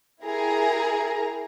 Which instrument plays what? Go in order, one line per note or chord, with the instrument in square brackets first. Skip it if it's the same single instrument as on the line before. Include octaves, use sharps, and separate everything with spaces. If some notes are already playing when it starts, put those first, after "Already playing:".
[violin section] E4 G4 G#4 A#4 A#5